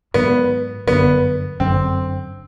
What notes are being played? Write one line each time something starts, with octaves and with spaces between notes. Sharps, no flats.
G#2 D#3 F#3 B3
G1 F#2 D3 B3
G1 F#2 D3 C4